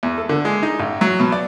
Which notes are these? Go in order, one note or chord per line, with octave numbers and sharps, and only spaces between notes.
E2
A4
D3
G#3
D#4
A1
F#3
B2
D5